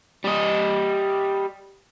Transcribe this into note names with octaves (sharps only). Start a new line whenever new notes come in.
G3 D#5